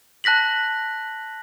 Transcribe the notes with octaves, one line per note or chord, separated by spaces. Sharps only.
A5 F#6 A#6 B6 F#7